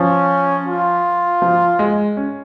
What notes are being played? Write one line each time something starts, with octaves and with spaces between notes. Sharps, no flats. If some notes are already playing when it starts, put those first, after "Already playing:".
Already playing: F3 C#4
F4
F3
G#3
C#4